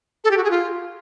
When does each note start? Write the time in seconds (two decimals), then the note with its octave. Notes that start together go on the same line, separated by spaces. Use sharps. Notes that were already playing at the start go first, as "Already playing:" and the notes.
0.24 A4
0.30 G4
0.37 F#4
0.44 G#4
0.50 F4